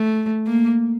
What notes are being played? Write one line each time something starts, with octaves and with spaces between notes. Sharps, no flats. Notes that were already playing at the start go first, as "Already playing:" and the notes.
Already playing: A3
A#3